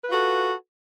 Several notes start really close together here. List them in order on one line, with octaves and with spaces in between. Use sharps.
B4 F4 F#4 A4